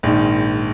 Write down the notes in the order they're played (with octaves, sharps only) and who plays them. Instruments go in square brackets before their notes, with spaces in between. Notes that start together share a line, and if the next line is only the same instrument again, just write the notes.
[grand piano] A#1 G#2 D#3